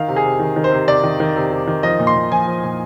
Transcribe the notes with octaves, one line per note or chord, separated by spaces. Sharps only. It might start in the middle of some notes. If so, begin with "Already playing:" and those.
Already playing: D#3 F5
C3
G#4
C3
D#3
D#3
C5
C3
C3 D5
D#3
D#3
C3
C3
D#3
F3 D#5
A#2
C6
A#2
F3 G#5
F3
A#2